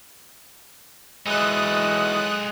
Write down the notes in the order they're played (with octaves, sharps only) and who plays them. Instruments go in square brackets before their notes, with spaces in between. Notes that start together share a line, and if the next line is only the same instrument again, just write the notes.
[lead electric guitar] E3 F#3 [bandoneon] G#3 [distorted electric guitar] D#4 A4 [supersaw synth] D#6 F#6